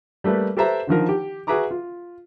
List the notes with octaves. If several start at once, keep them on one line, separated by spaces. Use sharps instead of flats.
G3 A3 A#3 B4
G4 A4 B4 C5 E5 A#5
D3 D#3 F3 A#4
G4
F#4 G#4 B4 E5 A#5 D6
F4